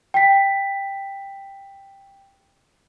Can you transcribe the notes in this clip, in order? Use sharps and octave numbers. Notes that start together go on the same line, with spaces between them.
G5 B6